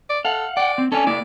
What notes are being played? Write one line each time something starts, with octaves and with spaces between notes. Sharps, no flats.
D5
A4 F5 F#5
D5 F#5 G5
C4
C#4 A4 D5 G#5
A#3 E4 D5